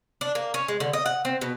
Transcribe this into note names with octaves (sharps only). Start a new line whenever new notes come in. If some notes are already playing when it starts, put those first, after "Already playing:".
D4
A#3
C#4
G#3
D3
D#5
F#5
C4
B2